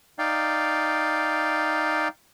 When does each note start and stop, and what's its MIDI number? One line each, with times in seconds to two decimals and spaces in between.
0.19 2.08 63
0.19 2.08 74
0.19 2.08 77
0.19 2.08 79